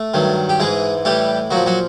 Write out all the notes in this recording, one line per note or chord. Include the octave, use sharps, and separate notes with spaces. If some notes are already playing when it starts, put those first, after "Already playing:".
Already playing: A3 A4
G2 D#3 F#3
G4
G#2 E3 G#3 G#4
A2 E3 G3 G4
A#2 F3 F#3 F#4
F#3 F#4